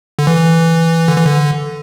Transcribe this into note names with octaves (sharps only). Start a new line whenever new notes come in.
D3
E3
D3
E3
D3